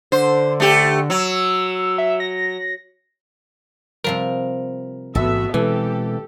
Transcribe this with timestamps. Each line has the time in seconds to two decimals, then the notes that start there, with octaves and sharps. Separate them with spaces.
0.12 D3 C5
0.60 A3 G4
1.10 F#3 E6
1.98 E5
2.20 A#6
4.04 C3 F3 G3 A#4
5.15 A1 G#2 E3 B3 F#4 A4 E5
5.54 B2 E3 G#3 C4 G4 A4 G#5